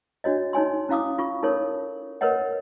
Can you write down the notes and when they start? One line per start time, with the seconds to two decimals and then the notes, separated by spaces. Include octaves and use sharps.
0.24 D4 F#4 C#5 D#5
0.53 D#4 C#5 G#5 C6
0.89 C#4 E4 F5 D6 D#6
1.18 F4 C#6
1.43 D#4 A4 A#4 C#5
2.21 A#4 B4 C#5 D#5 F#5